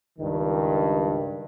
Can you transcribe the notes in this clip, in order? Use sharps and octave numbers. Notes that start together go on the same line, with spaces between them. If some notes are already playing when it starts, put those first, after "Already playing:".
C#2 G2 D#3